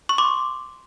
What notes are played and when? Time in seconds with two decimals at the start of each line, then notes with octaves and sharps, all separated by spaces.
0.09 C#6
0.18 C6 D6